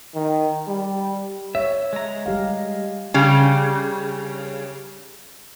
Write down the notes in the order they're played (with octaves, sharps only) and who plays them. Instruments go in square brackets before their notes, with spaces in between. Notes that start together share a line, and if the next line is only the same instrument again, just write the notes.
[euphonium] D#3
G3
[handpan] C#5 [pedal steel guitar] E5
[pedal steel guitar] G#3 A#5
[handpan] G3 G4 F5
[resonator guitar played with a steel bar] C#3 G3